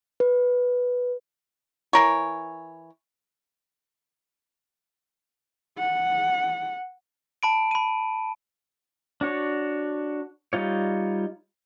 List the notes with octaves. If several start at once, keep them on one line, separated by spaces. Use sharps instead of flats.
B4
E3 A#4 C#5
F#5
A5 B5 D7
B5 D#7
D4 F#4 C#5
G3 D#4 F4 C#5